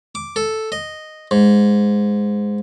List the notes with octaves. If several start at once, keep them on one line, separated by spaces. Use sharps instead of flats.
D6
A4
D#5
G#2